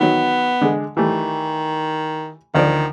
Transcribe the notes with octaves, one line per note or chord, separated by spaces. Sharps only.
D#3 F#3 B3
D3 G#3
D#3 E3 G3 A3
D2 D#3 F3 D5